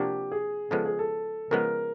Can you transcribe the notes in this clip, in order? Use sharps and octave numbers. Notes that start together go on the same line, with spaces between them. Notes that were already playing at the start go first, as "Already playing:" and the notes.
Already playing: C3 F3 A#3 D4 F#4 G4
G#4
C#3 F3 G#3 B3 A4
G#4
A4
C#3 F3 G#3 B3 A#4